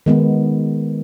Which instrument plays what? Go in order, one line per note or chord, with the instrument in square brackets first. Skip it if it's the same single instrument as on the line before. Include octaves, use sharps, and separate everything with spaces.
[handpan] D#3 G#3 B3